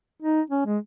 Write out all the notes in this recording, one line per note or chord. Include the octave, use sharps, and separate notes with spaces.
D#4
C#4
G#3